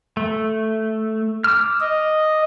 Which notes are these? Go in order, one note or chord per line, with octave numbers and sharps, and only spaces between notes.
A3
D6 E6 F6
D#5